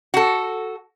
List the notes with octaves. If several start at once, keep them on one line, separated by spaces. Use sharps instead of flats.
F#4 A4